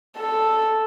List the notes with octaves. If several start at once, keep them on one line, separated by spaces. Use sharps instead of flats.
A4